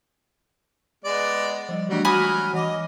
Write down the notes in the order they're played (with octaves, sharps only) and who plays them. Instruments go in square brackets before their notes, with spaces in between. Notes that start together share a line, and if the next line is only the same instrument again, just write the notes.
[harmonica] G#3 B3 D5
[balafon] F3 G3 D#5
[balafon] E3 A3 D4 [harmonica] F#3 G3
[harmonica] F#3 F6 [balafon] G#3 F4 F#4 [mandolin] G#5 B5 D#6
[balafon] E3 F#5 D6 [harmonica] D#5